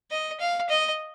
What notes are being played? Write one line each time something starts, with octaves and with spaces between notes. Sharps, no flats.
D#5
F5
D#5